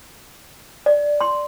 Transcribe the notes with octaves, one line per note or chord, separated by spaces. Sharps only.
D5
C6